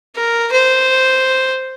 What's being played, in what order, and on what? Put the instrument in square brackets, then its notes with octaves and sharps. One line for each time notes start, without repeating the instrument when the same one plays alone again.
[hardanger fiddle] A#4
C5